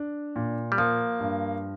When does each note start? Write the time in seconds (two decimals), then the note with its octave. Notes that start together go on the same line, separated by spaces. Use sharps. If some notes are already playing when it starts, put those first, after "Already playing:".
Already playing: D4
0.36 A#2
0.72 G3
0.78 F3 A#3
1.20 G2